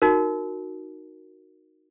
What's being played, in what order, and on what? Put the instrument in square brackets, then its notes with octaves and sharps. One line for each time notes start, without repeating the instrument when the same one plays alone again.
[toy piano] D#4 F#4 A#4